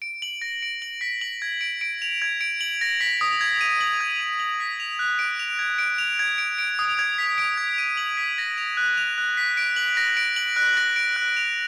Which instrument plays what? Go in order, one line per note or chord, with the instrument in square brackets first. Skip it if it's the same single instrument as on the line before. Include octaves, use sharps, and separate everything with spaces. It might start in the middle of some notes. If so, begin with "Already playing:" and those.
[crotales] D7
F#7
A#6
D7
F#7
B6
F#7
G#6
D7
D7
F7
G#6
D7
F#7
A#6
B6
D#6
G#6
D#7
F#7
G#6
D#7
F#7
B6
F7
F#6
D7
F7
G#6
D7
F7
G#6
D7
D7
D#6
G#6
B6
D7
G#6
D#7
F#7
B6
A#6
F7
F#6
F7
F#6
B6
D7
F#7
A#6
D7
F#7
F#6
A#6
D7
F#6
F7